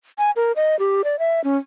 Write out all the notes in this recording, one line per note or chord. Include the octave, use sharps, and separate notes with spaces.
G#5
A#4
D#5
G4
D5
E5
C#4